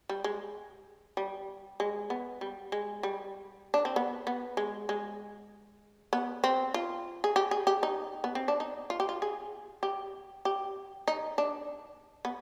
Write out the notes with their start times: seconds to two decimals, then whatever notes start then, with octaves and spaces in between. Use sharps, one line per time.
0.09 G3
0.24 G#3
1.17 G3
1.80 G#3
2.10 B3
2.41 G3
2.72 G#3
3.03 G3
3.74 D4
3.85 C4
3.96 B3
4.27 B3
4.57 G#3
4.89 G#3
6.13 B3
6.44 C4
6.74 F4
7.24 G#4
7.36 G4
7.51 G#4
7.67 G4
7.83 D#4
8.24 B3
8.35 C4
8.48 D4
8.60 D#4
8.90 F4
9.00 G4
9.09 F4
9.22 G#4
9.83 G4
10.45 G4
11.08 D#4
11.38 D4
12.25 B3